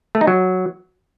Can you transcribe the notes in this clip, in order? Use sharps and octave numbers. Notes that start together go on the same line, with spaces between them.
A3
D#4
F#3